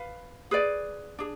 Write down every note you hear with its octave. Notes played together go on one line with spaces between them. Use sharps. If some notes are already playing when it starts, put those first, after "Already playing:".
Already playing: B4 F5
G#4 B4 D5
D4 G#4